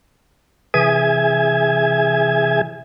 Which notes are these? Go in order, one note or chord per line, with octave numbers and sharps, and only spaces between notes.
C3 E3 G#4 E5 G#5 G#6